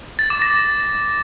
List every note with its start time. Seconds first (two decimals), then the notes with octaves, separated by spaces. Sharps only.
0.19 A6
0.30 D6
0.42 A#6